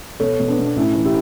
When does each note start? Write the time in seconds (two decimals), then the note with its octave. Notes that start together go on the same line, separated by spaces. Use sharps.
0.20 B2 A4 C#5
0.40 B2
0.48 B3 D4
0.59 B2
0.66 D4
0.76 A2 C#4 E4
0.95 E3
1.05 E4 G4